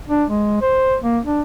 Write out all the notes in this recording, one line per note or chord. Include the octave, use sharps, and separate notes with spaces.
D4
G#3
C5
A#3
D4